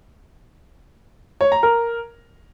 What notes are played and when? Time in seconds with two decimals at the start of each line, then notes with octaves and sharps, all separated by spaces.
1.41 C#5
1.52 A#5
1.63 A#4